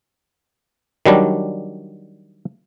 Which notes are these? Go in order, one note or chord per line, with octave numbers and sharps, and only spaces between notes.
D#3 F#3 G3 D4